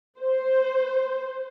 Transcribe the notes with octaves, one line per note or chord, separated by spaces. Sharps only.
C5